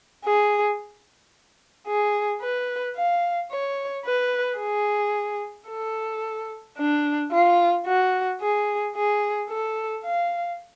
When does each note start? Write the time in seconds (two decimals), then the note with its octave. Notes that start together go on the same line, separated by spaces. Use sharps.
0.24 G#4
1.87 G#4
2.42 B4
2.96 F5
3.51 C#5
4.05 B4
4.59 G#4
5.69 A4
6.77 D4
7.32 F4
7.86 F#4
8.41 G#4
8.96 G#4
9.49 A4
10.04 F5